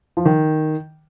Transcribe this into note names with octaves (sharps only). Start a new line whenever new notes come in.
F3
D#3